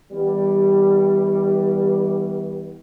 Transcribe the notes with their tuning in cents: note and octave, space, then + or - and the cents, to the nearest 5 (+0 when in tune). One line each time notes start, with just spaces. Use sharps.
E3 -35 G3 +5 B3 +0